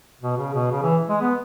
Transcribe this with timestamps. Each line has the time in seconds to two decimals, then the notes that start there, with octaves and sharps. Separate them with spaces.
0.21 B2
0.37 C#3
0.54 B2
0.71 C#3
0.83 E3
1.08 G#3
1.21 B3